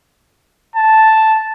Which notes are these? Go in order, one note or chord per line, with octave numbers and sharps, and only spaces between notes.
A5